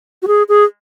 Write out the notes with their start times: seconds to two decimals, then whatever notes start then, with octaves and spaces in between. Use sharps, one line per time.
0.22 F#4
0.27 G#4
0.49 G#4